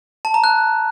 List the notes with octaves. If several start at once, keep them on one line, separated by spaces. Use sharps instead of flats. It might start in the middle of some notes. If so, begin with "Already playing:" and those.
A5
A#5
F#6